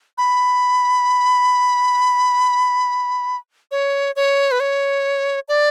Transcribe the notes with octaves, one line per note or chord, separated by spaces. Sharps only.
B5
C#5
C#5
B4
C#5
D5